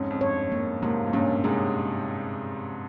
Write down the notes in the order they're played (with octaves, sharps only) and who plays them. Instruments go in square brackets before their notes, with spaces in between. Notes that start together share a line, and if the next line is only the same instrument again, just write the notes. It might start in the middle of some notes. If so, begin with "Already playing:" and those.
Already playing: [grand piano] F2 G#2 [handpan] C#4
[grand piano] F2
[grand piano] G2 [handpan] C#5
[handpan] A#3
[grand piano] G#2 C3 [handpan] A#3
[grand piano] G#2
[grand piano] G2 A#2 [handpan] C#4
[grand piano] G#2 C3 [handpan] G#4